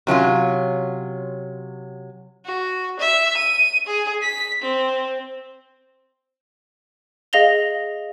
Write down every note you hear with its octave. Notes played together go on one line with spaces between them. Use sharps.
C3 F#3 C#4 F4
F#4
E5
D#7
G#4
B6
C4
G#4 D#5 F5 A#6 F7 G7